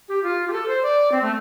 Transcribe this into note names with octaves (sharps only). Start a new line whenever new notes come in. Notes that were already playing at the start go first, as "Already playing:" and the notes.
G4
F4
G4
A4
C5
D5
C4
A3